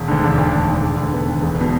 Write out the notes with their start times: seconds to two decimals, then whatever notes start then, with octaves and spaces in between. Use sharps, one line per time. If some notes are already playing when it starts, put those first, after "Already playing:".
Already playing: E1
0.08 D2 D3
0.23 E1 D4
0.38 D2 D3
0.52 E1
0.68 D2 D3
0.83 E1
0.98 D2 D3
1.13 E1 B3
1.28 D2 D3
1.42 E1
1.61 B2